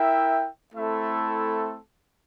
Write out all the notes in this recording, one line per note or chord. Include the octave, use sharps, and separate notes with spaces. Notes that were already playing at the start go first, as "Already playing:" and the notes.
Already playing: E4 A#4 E5 G5
A3 C4 E4 A4 E5